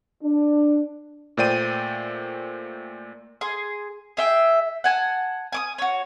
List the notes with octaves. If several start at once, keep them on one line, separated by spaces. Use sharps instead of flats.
D4
A#2 A3 C5 D5 G5 D#7
G#4 C6
G#4 E5 G5
F#5 G#5 A5
G#5 D6 D#6
F#4 C#5